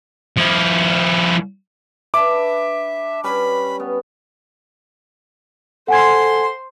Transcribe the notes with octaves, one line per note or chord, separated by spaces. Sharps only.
F3 E4
D4 B4 E5 D6
G3 C#4 B4 B5
B3
A4 C5 F#5 G#5 C6 G#6